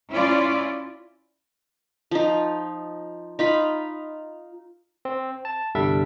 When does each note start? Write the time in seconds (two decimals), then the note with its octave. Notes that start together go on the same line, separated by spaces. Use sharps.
0.11 C#4 E4 F4 D5
2.11 F3 D#4
3.39 D#4 F4 B5
5.05 C4
5.45 A5
5.75 G1 C2 G3 D4 A4 E5